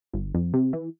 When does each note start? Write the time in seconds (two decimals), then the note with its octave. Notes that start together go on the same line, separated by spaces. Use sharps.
0.13 G1
0.35 F2
0.54 C3
0.73 E3